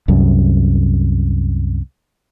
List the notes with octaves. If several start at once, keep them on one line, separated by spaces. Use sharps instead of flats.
C2 F#2